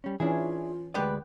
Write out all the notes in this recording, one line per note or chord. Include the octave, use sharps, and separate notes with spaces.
G3 C#4
E3 C#4 D4 E4 F4 G#4
D2 G#3 B3 G4 B4 D5